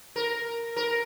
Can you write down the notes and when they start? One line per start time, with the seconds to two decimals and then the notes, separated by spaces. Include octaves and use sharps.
0.16 A#4
0.76 A#4